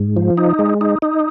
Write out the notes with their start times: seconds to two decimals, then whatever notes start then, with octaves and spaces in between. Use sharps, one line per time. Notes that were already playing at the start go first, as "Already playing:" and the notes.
Already playing: G#2
0.16 F3
0.38 D#4
0.59 G#3
0.81 D#4
1.02 D#4